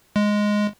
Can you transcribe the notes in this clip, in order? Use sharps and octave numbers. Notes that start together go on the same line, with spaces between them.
G#3